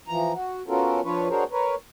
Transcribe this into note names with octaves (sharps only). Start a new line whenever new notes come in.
E3 F3 A#5
F#4
B3 C#4 F4 F#4 A4 A#4
F3 D4 F4 B4 C#5
D4 F#4 G#4 A#4 C5 C#5
A#4 B4 C#5